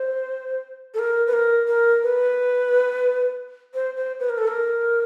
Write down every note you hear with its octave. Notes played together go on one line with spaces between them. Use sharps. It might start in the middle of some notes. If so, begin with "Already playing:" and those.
Already playing: C5
A4
A#4
B4
A#4
A#4
B4
C5
C5
B4
A#4
A4
A#4